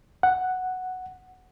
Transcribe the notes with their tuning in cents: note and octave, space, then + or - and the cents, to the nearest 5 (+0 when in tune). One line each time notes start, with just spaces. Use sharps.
F#5 +0